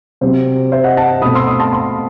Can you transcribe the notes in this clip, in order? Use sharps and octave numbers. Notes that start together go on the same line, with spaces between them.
C3 F#3 C4 C5
C5 E5
D#5 F#5
F#5 A5
B2 A3 C4 B5 D#6
C6 E6
B5 D#6
A5 C6
A5 C6